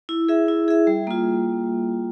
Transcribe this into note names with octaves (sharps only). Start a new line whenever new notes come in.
E4
G#4 E5
E4
G#4 E5
G3
A#3 F4